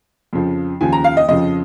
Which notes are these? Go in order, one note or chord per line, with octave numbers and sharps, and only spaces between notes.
F2 C#3 F3
D#2 C#3 F3 G#5
A#5
F5
D#5
F2 C#3 F3 D#5